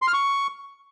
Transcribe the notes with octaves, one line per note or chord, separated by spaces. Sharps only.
C6
F6
C#6